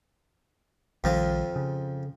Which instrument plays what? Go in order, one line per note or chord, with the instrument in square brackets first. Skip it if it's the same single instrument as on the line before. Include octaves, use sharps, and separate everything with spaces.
[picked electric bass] A#1 D#3 G3 [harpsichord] F2 F3
[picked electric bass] C#3